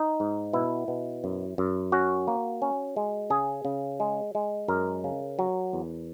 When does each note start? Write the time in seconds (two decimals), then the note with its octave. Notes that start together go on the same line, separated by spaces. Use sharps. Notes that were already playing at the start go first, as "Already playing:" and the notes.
Already playing: D#4
0.20 G#2
0.53 B2 E4
0.88 B2
1.24 F#2
1.58 F#2
1.92 C#4 F#4
2.28 A#3
2.62 C#4
2.96 G#3
3.30 C#3 G#4
3.65 C#3
4.00 G#3
4.35 G#3
4.68 F#2 A#4
5.04 C#3
5.39 F#3
5.73 E2